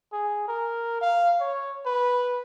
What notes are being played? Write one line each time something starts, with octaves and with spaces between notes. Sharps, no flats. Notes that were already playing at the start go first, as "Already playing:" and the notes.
G#4
A#4
F5
C#5
B4